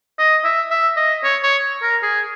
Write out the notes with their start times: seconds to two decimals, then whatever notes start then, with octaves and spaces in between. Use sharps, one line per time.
0.19 D#5
0.44 E5
0.71 E5
0.97 D#5
1.23 C#5
1.43 C#5
1.82 A#4
2.02 G#4